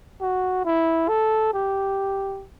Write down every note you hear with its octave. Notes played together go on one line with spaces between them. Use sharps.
F#4
E4
A4
G4